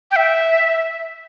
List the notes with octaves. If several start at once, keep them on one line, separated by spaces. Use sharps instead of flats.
G5
E5